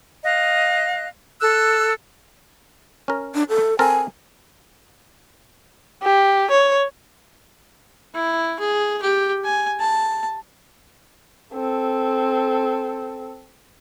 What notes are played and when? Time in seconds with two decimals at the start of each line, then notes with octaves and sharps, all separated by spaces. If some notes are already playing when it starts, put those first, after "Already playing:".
0.24 D#5 F5 F#6
1.41 A4 E6 F#6
3.08 C#4 A#4
3.35 D4
3.49 A4
3.79 C4 A4 A#4 G#5
6.03 G4
6.51 C#5
8.14 E4
8.59 G#4
9.02 G4
9.44 G#5
9.80 A5
11.54 C4 A4